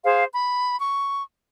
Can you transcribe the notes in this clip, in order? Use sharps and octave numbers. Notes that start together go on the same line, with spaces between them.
G#4 C5 F5
B5
C#6